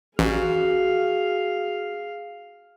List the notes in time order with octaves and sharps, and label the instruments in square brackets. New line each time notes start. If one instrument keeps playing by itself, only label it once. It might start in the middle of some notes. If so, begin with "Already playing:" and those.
[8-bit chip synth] A1 [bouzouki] F#4 [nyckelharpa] G#4 F5